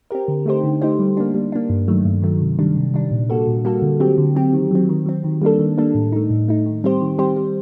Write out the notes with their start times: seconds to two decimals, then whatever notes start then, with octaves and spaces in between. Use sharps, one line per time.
0.11 C4 G4 A#4
0.28 D3
0.46 A3 D#4 G4 C5
0.64 D3
0.82 A3 D#4 G4 C5
0.99 G3
1.17 A#3 D4
1.34 G3
1.52 A#3 D4
1.70 G2
1.88 D#3 F#3 A3
2.05 G2
2.22 D#3 F#3 A3
2.41 C3
2.59 D#3 G3 D4
2.76 C3
2.94 D#3 G3 D4
3.11 A#2
3.30 G3 A#3 F#4 A4
3.47 A#2
3.65 G3 A#3 F#4 A4
3.82 D3
4.00 F#3 C4 G4
4.18 D3
4.35 F#3 C4 G4
4.53 D#3
4.71 F#3 C4
4.89 D#3
5.06 F#3 C4
5.24 D#3
5.42 G3 A#3 D4 A4
5.59 D#3
5.78 G3 A#3 D4 A4
5.95 A2
6.12 A3 D#4
6.30 A2
6.48 A3 D#4
6.66 D#3
6.84 G3 C4 G4 C5
7.01 D#3
7.19 G3 C4 G4 C5
7.37 G3